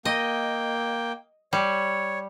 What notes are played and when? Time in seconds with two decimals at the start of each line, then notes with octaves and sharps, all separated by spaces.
0.05 A#3 D#5 G5
1.53 G3 C#5